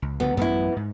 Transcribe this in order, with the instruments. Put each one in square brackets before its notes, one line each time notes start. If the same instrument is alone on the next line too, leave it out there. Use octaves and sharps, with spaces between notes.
[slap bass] C#2
[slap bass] C#2 D3 F3 [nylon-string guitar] B3
[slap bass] A1 F#2 [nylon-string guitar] B3 E4
[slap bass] G#2